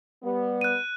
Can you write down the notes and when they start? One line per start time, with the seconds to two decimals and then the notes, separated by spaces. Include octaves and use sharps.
0.23 G3 B3
0.61 F#6 D#7